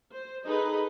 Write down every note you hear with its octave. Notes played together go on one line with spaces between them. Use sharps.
C5
D#4 G#4 A4 B4 D#5